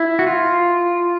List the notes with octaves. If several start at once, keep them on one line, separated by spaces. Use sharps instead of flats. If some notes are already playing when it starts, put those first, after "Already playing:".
Already playing: E4
F#4
F4